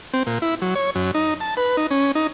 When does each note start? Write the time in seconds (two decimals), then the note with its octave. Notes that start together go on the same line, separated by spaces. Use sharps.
0.13 C4
0.27 A#2
0.42 E4
0.62 F#3
0.75 C#5
0.95 F#2
1.15 D#4
1.40 A5
1.57 B4
1.77 D#4
1.91 C#4
2.15 D#4